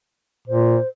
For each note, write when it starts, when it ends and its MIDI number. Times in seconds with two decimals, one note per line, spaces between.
0.48 0.78 46
0.48 0.88 72